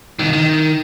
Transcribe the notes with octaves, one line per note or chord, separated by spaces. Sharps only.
C2 D#3
D#3